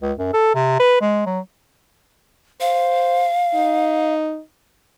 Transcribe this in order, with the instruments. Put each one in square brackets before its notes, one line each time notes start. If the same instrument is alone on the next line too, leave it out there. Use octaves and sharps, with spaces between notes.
[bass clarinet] C#2
F#2
A4
C3
B4
G#3
F#3
[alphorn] C5 [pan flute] F5
[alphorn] D#4